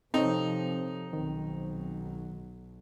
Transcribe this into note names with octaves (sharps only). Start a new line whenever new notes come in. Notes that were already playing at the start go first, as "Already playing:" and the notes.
C3 F3 C4 D#4 A4 C#5
B1 D#3 F#3